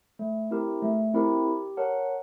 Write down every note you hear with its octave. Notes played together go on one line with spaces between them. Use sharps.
A3
C4 E4 G4 A#4
A3
C4 E4 G4 A#4
G4
A#4 C#5 F#5 A5